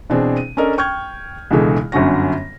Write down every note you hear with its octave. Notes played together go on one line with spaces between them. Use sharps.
B2 E3 C4 D4 G#4
D#7
C#4 D4 A4 A#4 D#5
G5 C#6 F6 G6 G#6
C#2 B2 D3 E3 G#3 A3
G1 F#2 D3 C#4 F#4 A#6